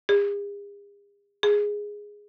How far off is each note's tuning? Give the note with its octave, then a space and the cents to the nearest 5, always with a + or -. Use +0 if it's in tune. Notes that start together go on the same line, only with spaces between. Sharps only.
G#4 -45
G#4 -5